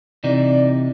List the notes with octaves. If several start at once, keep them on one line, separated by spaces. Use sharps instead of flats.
C3 E3 D#4 D5